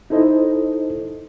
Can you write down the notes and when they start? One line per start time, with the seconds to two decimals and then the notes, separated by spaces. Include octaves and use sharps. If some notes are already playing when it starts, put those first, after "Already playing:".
0.10 D#4 E4 A4 C5 D#5